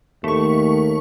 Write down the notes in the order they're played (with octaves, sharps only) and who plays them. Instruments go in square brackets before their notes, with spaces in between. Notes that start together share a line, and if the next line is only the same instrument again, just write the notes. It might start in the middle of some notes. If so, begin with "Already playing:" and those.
[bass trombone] D#2 [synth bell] A3 C#6